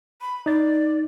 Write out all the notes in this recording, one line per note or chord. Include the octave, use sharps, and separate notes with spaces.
B5
D#4 D5 A6